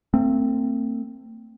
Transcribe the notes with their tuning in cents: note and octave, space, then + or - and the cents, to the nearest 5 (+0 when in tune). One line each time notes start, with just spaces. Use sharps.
A3 +45 C4 +0